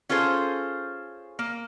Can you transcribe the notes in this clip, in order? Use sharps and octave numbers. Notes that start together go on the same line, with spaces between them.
C#4 F4 G#4 A4 C5
A#3